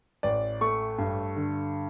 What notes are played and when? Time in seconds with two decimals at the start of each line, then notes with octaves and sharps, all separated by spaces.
0.23 A1 D5
0.61 A3 C#6
0.98 G2
1.36 D3